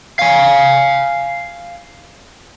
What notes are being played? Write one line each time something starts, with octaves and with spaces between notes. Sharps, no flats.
F5 G#5